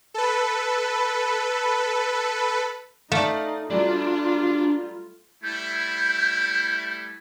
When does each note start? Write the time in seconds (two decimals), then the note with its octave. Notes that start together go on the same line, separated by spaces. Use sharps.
0.14 A4 B4
3.12 A3 D#4 D5 F5
3.70 F#3 G3 D4 F4 D5
5.43 G3 A3 E4 G6